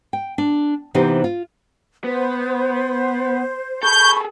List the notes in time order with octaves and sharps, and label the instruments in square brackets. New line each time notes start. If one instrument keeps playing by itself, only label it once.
[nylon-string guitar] G5
D4
C3 E3 B3 D#4 G4 C5
F4
[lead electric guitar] B3 [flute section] C5
[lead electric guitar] G#4 A4 [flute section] B5 C#6 [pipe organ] G6